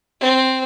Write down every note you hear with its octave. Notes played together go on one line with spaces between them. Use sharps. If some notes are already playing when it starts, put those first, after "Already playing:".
C4